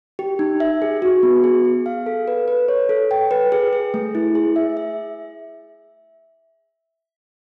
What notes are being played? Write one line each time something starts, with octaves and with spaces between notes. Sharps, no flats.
G4
D#4
E5
G#4
F#4
B3
G#4
G#4
F5
A4
B4
B4
C#5
A4
G5
B4
G#4
G#4
A3
E4
G#4
E5
E5